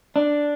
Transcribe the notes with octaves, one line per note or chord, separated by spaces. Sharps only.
D4